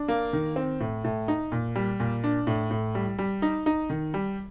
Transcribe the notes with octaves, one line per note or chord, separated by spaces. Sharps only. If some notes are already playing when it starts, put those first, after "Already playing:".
Already playing: D4
A#3
D#3
C4
A2
A2
D#4
A#2
G3
A#2
D4
A2
A2
G3
G3
D#4
D#4
D#3
G3